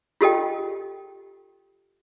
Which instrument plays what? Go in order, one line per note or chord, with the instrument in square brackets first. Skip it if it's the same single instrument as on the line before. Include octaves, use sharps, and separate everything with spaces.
[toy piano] F4 G4 A4 D#5 G5